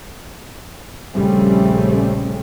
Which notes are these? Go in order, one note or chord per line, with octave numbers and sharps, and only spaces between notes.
A#1 C#3 G3 A3 C4 C#4